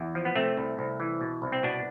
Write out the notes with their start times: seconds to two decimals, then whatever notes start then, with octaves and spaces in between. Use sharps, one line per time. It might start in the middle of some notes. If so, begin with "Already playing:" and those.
Already playing: E2
0.15 F3
0.25 B3
0.36 C3 A3 C4
0.57 C2
0.79 C2
1.00 E3
1.21 B2
1.42 C2
1.52 C4
1.63 B2 B3 D4